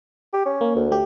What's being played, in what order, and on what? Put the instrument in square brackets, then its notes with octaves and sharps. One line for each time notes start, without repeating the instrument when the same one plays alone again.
[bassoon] G4
C#4
[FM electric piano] A#3
[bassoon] D2
[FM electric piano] A3 G4